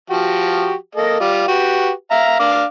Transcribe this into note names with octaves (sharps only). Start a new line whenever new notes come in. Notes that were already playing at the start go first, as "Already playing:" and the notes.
F3 F#4 G4
A#3 A4 D#5
G3 F4
F#4 G4 B4
E5 F5 A#5
D4 F5 D6